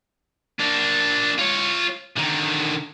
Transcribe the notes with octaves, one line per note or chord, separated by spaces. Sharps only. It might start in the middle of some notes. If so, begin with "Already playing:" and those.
A#3 D4
F4 C#5
D3 D#3